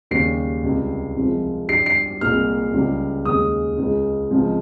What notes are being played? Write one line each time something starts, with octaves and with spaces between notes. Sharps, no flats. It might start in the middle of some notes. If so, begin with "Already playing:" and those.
D#2 C#3 G3 C7
C#2 C3 G3
C2 C3 F3 G#3
G2 G3 C7
C7
C2 A#2 G#3 F6
C#2 C#3 G3
D#2 C#3 G#3 D#6
C#2 C#3 G#3
C#2 C3 F3 G#3